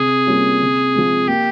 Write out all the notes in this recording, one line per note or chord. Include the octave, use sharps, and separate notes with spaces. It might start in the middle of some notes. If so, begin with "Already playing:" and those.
Already playing: C3 G#4
G3 A#3 C#4 F4
C3
F3 G#3
A#3 G4